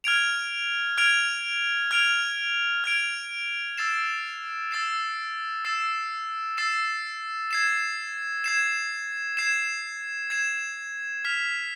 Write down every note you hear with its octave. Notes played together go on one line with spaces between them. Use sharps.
F6 G#6 D7 F7
F6 G#6 D7 F7
F6 G#6 D7 F7
F6 G#6 D7 F7
E6 A6 C7 E7
E6 A6 C7 E7
E6 A6 C7 E7
E6 A6 C7 E7
G#6 C7 E7
G#6 C7 E7
G#6 C7 E7
G#6 C7 E7
F6 B6 F7